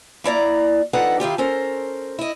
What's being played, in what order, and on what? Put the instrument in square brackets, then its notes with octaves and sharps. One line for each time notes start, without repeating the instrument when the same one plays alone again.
[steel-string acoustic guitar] A#3 E4 D5 A#5
F2 D4 D#4 A4 B4 F#5
D#3 E4 F4 G4
C#4 A4 A#4 C5
E4 D#5